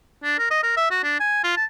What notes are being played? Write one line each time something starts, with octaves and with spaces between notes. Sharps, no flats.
D4
A#4
D#5
A#4
E5
F#4
D4
G#5
F4
A5